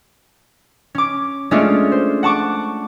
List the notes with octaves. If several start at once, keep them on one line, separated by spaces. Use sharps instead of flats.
C#4 D6
G#3 A3 C#4 D4 F4
C5
F#5 A5 C#6 D6